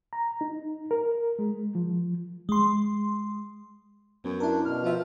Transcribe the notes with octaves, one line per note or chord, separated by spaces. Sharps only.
A#5
D#4
A#4
G#3
F3
G#3 C6
F#2 B3
D4 E4 A#4
B2 F6
F3 F4 E5